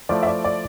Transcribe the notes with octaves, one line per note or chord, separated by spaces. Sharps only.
F3 A3 E4 D5
E5
D5
D5